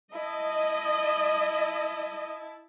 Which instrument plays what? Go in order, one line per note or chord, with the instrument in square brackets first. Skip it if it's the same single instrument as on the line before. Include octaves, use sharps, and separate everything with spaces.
[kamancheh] E4 A5 [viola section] D#5